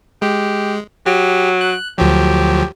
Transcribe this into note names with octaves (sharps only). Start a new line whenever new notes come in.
G#3 G4
F#3 G4
F#6
D2 F3 F#3 G4